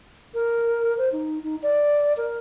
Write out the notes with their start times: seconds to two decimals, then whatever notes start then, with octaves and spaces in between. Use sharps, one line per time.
0.34 A#4
0.98 C5
1.12 D#4
1.44 D#4
1.63 D5
2.17 A#4